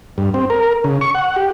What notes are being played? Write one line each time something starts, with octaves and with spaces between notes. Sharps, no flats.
G2
C4
A#4
C#3
C#6
F#5
G4